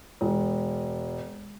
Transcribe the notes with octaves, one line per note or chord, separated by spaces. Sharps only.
E1